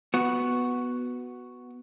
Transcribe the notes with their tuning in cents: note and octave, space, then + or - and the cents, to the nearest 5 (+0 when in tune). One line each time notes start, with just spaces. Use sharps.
B3 +0 F#4 +0